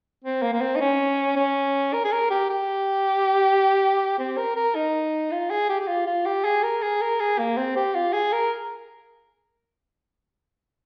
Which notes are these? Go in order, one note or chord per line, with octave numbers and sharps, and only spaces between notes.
C4
A#3
A#3
C4
D#4
C#4
C#4
A#4
G#4
A#4
G4
G4
C4
A#4
A#4
D#4
F4
G#4
G4
G4
F4
F4
G4
G#4
A#4
G#4
A#4
G#4
A#3
C4
G4
F4
G#4
A#4